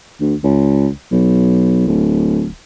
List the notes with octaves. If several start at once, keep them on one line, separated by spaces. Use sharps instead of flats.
D2
C#2
B1
D1